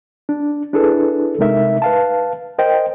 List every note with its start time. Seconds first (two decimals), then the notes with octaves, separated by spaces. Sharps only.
0.29 D4
0.73 D4 E4 G#4 A4 B4
1.39 C2 C3 G#3 D#4 A#4 E5
1.82 B4 F5 A5
2.58 A#4 C5 D#5 G5